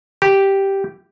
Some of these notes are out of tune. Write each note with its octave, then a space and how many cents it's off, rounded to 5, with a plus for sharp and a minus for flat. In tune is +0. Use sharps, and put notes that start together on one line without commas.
G4 -5